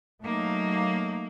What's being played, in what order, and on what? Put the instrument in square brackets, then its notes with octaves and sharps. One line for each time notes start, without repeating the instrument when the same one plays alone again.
[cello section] F#3 A#3 [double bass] A3 D#4